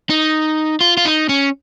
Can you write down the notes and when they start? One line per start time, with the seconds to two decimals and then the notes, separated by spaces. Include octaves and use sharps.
0.10 D#4
0.81 F4
0.97 F4
1.05 D#4
1.29 C#4